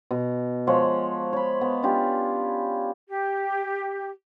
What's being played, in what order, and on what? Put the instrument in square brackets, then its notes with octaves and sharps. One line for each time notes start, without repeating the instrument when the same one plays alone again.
[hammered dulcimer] B2
F3 G#3 C#5 F#5
C#5 B5
B3
C#4 D4 F4 G4
[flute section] G4